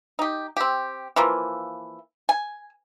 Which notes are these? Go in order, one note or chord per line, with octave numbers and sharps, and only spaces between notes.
D#4 G4
C4 G4
E3 F3 A#3
G#5